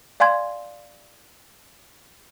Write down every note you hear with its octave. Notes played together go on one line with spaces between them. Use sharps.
D5 F5 G#5 C6 G#6